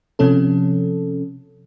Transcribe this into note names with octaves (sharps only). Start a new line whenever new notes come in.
C3 F3 C#4 A4